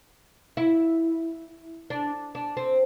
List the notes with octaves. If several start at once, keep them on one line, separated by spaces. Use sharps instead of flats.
E4
D4
D4
C4